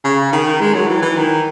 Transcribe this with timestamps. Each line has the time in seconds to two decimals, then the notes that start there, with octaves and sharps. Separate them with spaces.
0.04 C#3
0.32 D#3
0.61 G#3
0.74 F#3
0.88 E3
1.02 E3
1.17 D#3